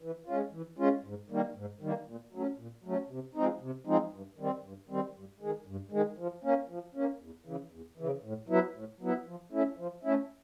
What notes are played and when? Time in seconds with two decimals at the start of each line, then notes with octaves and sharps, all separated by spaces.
0.01 E3
0.26 G#3 C#4 F4
0.52 E3
0.78 G#3 C#4 F4
1.04 G#2
1.30 D#3 G3 A#3
1.56 G#2
1.81 D#3 G3 A#3
2.06 A#2
2.32 F#3 A3 C#4
2.58 A#2
2.84 F#3 A3 C#4
3.09 C3
3.35 F3 G#3 C4 D#4
3.61 C3
3.87 F3 G#3 C4 D#4
4.12 G2
4.38 D#3 G3 C4
4.63 G2
4.89 D#3 G3 C4
5.15 G2
5.41 D#3 G#3
5.67 G2
5.92 D#3 G#3
6.18 F3
6.44 A#3 C#4
6.69 F3
6.95 A#3 C#4
7.21 E2
7.46 C#3 E3
7.71 E2
7.98 C#3 E3
8.23 A2
8.48 F#3 B3 E4
8.75 A2
9.01 F#3 B3 E4
9.26 F3
9.52 A3 C#4 E4
9.77 F3
10.03 A3 C#4 E4